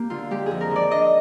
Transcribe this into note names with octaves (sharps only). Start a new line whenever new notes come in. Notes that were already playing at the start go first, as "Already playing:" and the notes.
Already playing: A#3 G4
D3 F4
G#3 G4
F2 G#4
A#4
D#3 D5
D4 D#5